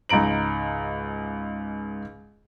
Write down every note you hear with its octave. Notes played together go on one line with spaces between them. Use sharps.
C#2 G#2 A#5 D7 F#7